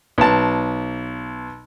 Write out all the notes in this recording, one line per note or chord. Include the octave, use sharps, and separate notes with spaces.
B1 A5